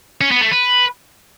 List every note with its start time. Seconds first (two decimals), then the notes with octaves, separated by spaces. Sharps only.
0.21 C#4
0.31 B3
0.41 A3
0.51 B4